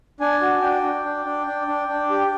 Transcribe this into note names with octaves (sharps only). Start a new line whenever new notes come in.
D4 G#5
F#4
D4 G5
D4
D4
D4
D4
D4
D4
G4